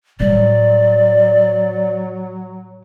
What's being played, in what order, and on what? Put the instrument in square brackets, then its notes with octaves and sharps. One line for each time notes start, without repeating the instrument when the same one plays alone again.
[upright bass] A2 G3 [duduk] F#3 [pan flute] D5